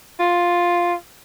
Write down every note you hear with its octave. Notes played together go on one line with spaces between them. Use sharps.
F4